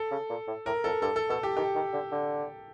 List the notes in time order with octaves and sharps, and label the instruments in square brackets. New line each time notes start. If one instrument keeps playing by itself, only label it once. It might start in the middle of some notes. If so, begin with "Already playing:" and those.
Already playing: [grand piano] A4
[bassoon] C#3
A#2
A2
[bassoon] A2 [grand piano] A#4
[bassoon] F2 [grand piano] A4
[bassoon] G2 [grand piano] A4
[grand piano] A4
[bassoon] B2 [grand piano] A4
[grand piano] G4
[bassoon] D#3 [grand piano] G4
[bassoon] D#3
D3
D3